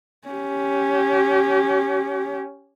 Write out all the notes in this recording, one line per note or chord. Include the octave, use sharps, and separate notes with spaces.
C#4 G4